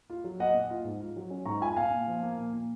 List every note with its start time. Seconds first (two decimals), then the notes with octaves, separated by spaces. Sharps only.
0.10 F4
0.24 F#3
0.39 A#3 D#5 F#5
0.54 A#2
0.70 F4
0.85 G#2
1.01 F4
1.16 F#3
1.30 C#4
1.46 G#2 A#5 C#6
1.61 F4 G#5 B5
1.77 A#2 F5 G#5
1.91 A#2
2.07 F3
2.23 A#3
2.37 A#2
2.53 A#2